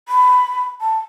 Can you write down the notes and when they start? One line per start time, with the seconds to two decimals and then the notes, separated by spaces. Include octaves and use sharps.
0.09 B5
0.81 A5